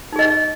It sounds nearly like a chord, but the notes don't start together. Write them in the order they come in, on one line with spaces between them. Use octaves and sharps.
D#4 G#4 D#5